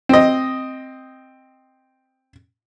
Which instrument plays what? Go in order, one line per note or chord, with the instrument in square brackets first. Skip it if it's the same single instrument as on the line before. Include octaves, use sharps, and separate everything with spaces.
[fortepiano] C4 D#5